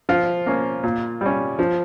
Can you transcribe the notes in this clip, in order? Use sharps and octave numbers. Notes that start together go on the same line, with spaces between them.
F3 F4
A#3 C#4
A#2
G3 C#4
F3